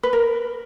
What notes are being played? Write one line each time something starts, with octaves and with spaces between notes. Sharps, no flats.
B4
A#4